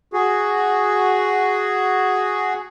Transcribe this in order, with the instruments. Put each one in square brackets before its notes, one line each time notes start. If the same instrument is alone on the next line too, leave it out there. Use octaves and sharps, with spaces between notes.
[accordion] F#4 G#4